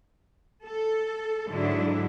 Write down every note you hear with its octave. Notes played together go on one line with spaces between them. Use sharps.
A4
G#2 D3 F#3 G#3 D4 E4